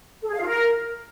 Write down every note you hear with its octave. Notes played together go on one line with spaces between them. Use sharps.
A4
G#4
F5
F4
A#4